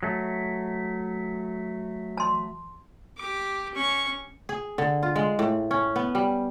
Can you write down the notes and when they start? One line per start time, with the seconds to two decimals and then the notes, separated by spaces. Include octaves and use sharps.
0.03 F#3 A3
2.17 A5 C6
3.17 G4 D6
3.74 C#4 C#6
4.49 G#4
4.78 D3
5.03 F4
5.16 G#3
5.39 A2
5.71 C#4
5.96 B3
6.15 G3